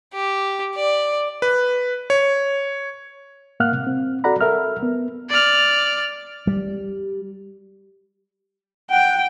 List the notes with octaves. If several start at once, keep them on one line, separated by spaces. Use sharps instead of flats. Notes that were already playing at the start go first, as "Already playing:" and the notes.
G4
D5
B4
C#5
A2 A#3 F5 F#5 F6 F#6
C3
C4
F#4 A4 D5 F#5 A#5 B5
A4 A#4 E5 F6
B3
D5 F6
G3
F#5 G5